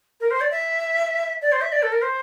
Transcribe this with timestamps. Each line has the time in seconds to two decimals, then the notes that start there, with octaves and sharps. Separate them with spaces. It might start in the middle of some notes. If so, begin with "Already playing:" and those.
0.20 A#4
0.30 C5
0.41 D5
0.51 E5
1.41 D5
1.52 C5
1.61 E5
1.72 D5
1.82 A4
1.92 A#4
2.02 C5